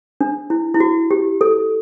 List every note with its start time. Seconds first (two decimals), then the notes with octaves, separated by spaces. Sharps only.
0.21 D4
0.50 E4
0.74 E4
0.80 F#4
1.11 G4
1.41 A4